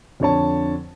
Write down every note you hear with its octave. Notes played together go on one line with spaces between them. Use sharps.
F2 D3 C#5 A5